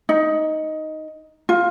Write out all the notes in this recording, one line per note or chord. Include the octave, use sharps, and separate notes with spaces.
D#4
F4